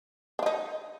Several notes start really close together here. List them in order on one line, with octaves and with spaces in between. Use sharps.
D4 F4 D#4